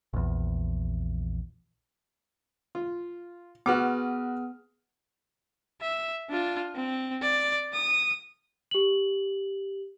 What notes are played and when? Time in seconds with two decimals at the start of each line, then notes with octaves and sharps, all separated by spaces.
0.13 A#1 E2
2.75 F4
3.66 B3 F#4 G#4 B4 D6 F6
5.82 E5
6.29 D4 F4
6.75 C4
7.22 D5
7.73 D#6
8.71 G4 F#7